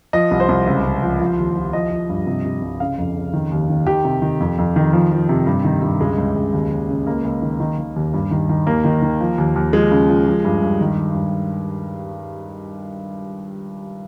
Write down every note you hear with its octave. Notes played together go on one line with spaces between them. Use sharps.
F3 D#5
C2
C5
C2
C#2
C#2
F3
F3
D#2
F3
F3 D#5
F3
G2
C3
C3
C2
C#3 F5
F2
C#3
D#3
D#2
D#3
D#3 G4
C3
D#3
F2
F2
D#3
F3
F3
C3
G2
D#3
G2
C#2 G#3
C#2
C#2
D#2
D#2
C#3
C#2 A#3
C#2
D#3
D#3
D#3
D#2
G2
D#3
D#3
D#2 A#3
D#3
D#3
F3
D#2
D#2
F3 G#3
C#3
F3
F3
G2
G2
D#3
D#3
G2